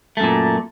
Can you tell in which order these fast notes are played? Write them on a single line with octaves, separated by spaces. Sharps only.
A3 F#2 A#2